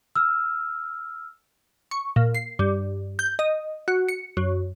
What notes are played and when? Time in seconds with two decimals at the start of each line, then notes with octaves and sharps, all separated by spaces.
0.16 E6 F6
1.91 C#6
2.16 A#2
2.34 C7
2.59 G2
3.19 G6
3.39 D#5
3.88 F#4
4.08 C#7
4.37 F#2